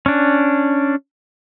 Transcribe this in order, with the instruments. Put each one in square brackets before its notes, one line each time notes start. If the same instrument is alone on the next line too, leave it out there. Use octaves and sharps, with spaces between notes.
[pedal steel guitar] C#4 D4